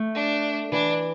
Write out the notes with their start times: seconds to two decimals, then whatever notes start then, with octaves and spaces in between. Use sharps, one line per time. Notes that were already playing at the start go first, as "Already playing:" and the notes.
Already playing: A3
0.15 D4
0.72 E3 D4